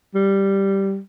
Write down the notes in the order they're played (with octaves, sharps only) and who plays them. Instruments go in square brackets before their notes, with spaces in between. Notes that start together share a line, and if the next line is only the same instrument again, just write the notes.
[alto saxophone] G3